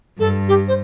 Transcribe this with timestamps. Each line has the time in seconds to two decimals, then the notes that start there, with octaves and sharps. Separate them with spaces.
0.19 G2 A4
0.48 G4
0.68 C5